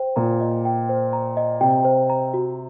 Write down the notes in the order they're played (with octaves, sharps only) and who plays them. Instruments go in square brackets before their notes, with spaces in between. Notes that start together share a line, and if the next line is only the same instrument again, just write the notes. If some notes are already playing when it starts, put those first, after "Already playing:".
Already playing: [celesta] C5 G5
[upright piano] A#2 [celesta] A#5
[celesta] D#5
G5
C5
A#5
D#5
[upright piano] C3 [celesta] G5
[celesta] C5
A#5
F#4